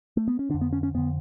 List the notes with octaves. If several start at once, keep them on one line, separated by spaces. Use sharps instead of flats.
A3
B3
C#4
F2 D3 D4
B3
C#4
C#4
F2 D3 B3